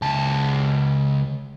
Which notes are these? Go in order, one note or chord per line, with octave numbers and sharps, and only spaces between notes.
C#2 A5